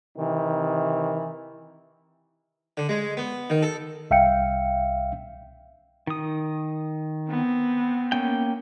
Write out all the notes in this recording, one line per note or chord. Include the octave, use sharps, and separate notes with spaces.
C3 D#3 E3
D3
G#3
B3
D#3
A4
C2 E5 F5 G5 C#7
D#3 D#6
B3 C4
A#3 C#4 G5